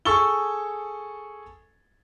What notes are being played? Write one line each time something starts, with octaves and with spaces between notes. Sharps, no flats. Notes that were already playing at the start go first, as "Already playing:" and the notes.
G#4 A4 C#6 E6 A6 G7